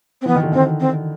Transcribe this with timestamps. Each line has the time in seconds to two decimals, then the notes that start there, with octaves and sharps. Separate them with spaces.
0.21 C4
0.26 E3 B3
0.35 D#3
0.43 D3
0.52 D#3 C4
0.80 C4